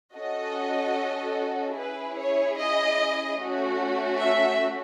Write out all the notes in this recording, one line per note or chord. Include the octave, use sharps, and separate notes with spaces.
C#4 F#4 A4 D#5
C#4 E4 G#4 B4
C#5
D#5
A3 C#4 F#4
E5